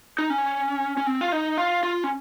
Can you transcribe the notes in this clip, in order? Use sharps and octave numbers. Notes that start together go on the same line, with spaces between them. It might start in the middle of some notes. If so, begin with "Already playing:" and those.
D#4
C#4
C#4
C4
F4
D#4
F4
F4
C#4